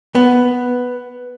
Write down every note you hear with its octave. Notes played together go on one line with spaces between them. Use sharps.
B3